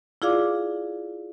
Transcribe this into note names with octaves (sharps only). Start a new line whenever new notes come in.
E4 F4 G#4 D5 F5 D6